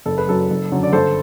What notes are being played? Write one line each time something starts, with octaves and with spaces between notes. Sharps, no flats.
F#1 A4
B4
F#2 F#3 A4
F#1
F#2 D3 F#3
D5
G1 A4 C5